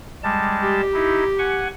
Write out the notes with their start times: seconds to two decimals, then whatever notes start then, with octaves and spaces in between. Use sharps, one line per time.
0.23 G3 G#3 A5
0.63 G4
0.94 D#4 E4
1.39 F#5 G#5 C#6